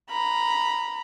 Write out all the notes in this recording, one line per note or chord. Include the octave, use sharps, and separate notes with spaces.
A#5 B5